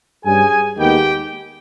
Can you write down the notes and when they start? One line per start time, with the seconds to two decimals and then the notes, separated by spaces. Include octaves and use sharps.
0.25 G2 G3 C#4 G#4 G#5
0.78 D#2 D#3 G#3 B3 G4 G5